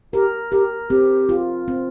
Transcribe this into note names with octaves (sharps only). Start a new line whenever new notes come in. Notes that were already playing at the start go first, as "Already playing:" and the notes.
G4 A#4
G4 A#4
C4 G4
F4
C4